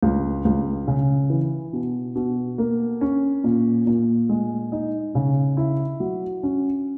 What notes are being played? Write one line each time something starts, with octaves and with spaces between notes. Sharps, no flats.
C#2
C#2
C#3
E3
B2
B2
A#3
C#4
A#2
A#2
G#3
D#4
C#3
E4
F#3
C#4